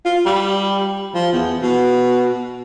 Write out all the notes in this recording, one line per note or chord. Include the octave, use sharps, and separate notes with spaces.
F4
G3
F3
E2
B2